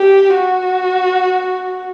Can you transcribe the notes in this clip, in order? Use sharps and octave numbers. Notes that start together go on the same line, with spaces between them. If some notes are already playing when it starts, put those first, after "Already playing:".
Already playing: G4
F#4